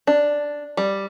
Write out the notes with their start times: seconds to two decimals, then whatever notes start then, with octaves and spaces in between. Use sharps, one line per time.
0.07 D4
0.77 G3